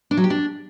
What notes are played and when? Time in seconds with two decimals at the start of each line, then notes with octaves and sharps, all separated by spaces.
0.11 D4
0.17 F#3
0.24 G4
0.30 D4